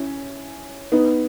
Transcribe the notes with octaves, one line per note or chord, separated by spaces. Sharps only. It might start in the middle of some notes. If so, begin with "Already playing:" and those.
Already playing: C#4 E4
B3 D#4